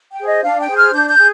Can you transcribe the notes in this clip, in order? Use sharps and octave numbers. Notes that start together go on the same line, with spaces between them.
G5
G#4 C5
D#5
D4 F5
G5
G#4 C5
F6
D4 G6
G6
G#4